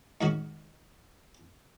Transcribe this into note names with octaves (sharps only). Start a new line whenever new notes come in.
G#2 D#3 C#4 F#4